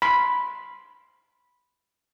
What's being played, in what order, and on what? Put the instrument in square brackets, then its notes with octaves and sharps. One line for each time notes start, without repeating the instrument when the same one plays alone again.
[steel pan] B5 C6